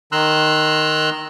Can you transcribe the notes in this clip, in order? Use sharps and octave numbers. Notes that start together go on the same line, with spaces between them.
D#3 A#5 C6 E6 F#6